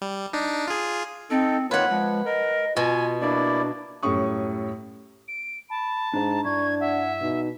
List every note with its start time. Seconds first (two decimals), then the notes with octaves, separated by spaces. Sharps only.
0.02 G3
0.33 D4 D#4
0.67 F4 G#4
1.30 C4 D#4 A4
1.71 D#3 A#3 F4 B4 C#5 F#5
1.89 F3 G#3
2.26 A#4 D#5
2.77 B2 F4 G#5
3.21 A#3 D4 E4 D5
4.03 F#2 A2 G3 C#4 C#6 D#6
5.28 D7
5.70 A5 B5
6.14 G#2 D4 D#5 A#5
6.44 G2 D4 E4 C#6 G#6
6.80 E5 F#5
7.21 B2 D#4